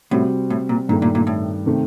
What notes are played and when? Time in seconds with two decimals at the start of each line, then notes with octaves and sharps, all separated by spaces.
0.11 A2 C3 G3 C4 F#4
0.50 A2
0.69 A#2
0.89 G2 A#2 D#3 A3
1.02 A#2
1.15 A#2
1.27 A2
1.66 C3 D#3 A3 C4